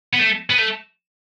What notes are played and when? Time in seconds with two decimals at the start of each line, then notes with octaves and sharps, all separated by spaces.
0.13 B3
0.19 A3
0.50 B3
0.58 A3